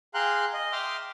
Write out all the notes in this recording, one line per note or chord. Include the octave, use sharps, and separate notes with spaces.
G#4 F5 G5 A#5 C6 F#6
D#5
E5 G5 C6 D6 D#6 F6